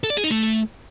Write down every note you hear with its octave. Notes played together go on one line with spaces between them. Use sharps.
A4
D5
G#4
D#4
A3